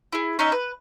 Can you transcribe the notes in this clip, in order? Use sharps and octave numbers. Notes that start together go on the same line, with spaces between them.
E4 G#4
C#4 D#4 D#5 E5
B4